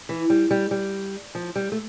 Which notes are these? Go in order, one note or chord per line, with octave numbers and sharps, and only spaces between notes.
E3
G3
G3
G3
F3
G3
A3